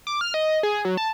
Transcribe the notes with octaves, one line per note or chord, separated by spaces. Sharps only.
D6
F6
D#5
G#4
F#3
A5